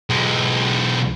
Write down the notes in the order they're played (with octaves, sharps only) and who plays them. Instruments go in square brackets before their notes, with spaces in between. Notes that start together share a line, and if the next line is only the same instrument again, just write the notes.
[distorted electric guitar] B1 G#3